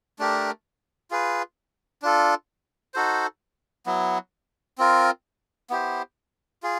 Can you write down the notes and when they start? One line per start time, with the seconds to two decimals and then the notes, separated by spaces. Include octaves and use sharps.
0.19 A3 D4 G4 A#4
1.11 F4 G#4 B4
2.02 D4 F4 A4
2.94 D#4 F#4 A4 C5
3.86 F#3 B3 E4
4.78 C4 F4 A#4
5.70 B3 E4 G4 C5
6.63 F4 G#4